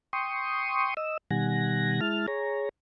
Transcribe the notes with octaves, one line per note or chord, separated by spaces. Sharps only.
G5 C6 C#6 D#6
D#5 E6
B2 D#3 G3 F#5 G#5 A#6
G#3 E4 A5 F6
G#4 C#5 A#5